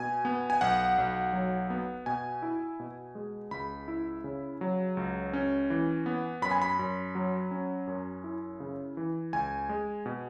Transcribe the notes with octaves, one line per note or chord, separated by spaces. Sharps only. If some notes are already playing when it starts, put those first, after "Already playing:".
Already playing: B2 G#5
B3
G#5
B1 F#5
B1
F#3
B3
B2 G#5
E4
B2
G#3
C#2 B5
E4
C#3
F#3
C#2
C#4
E3
B3
F#2 B5
G#5
B5
F#2
F#3
C#4
F#2
E4
C#3
E3
C#2 G#5
G#3
B2